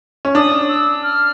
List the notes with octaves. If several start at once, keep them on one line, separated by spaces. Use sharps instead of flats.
C#4
D4 D#6
E6
F6